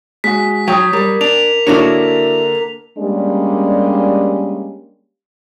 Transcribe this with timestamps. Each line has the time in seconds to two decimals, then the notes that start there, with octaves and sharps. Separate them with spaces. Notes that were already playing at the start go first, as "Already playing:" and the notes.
0.24 G#3 F#4 B6
0.68 F#3 G5 D#6 G#6
0.93 G3 A#4 D5
1.21 D4 F7
1.67 D3 A#3 D4 E4 F#4 A4 A#4 C#5
2.98 G3 G#3 A#3 C#4 D4 G4